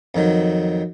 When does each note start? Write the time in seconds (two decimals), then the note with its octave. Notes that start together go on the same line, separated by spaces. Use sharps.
0.15 F2 D#3 F#3